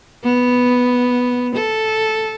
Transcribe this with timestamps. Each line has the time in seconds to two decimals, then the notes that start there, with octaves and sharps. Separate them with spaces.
0.24 B3
1.56 A4